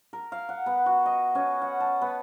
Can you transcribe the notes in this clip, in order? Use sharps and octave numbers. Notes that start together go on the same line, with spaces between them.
A#4
F5
F#5
B3
F#4
D#5
C#4
F#5
A5
B3